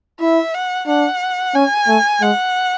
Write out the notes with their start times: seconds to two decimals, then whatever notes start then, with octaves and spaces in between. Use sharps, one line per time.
0.20 E4 E5
0.54 F#5
0.87 D4 F#5
1.55 C#4 G#5
1.88 A3
2.21 G#3 F#5